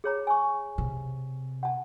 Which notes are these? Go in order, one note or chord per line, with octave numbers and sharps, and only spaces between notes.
G#4 C#5 A#5
G#5 C#6
C3
F#5 A5